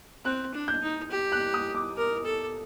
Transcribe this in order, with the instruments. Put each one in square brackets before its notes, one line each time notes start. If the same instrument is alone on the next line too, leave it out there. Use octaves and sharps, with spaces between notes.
[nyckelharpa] C4 [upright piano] F#6
[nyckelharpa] D4
[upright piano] G6
[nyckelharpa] D#4
G4
[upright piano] F#6
D#6
D6
[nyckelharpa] A#4
A4